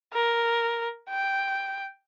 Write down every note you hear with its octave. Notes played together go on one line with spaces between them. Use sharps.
A#4
G5